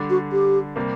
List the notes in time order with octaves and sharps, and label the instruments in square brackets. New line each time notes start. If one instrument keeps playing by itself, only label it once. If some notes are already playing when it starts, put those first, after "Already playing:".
Already playing: [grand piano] D3 G3 D4
[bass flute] F#4
G4
[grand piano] C3 G3 A#3